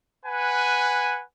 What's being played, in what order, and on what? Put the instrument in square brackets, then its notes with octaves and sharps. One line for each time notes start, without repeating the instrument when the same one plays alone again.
[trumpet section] B4 F#5 G#5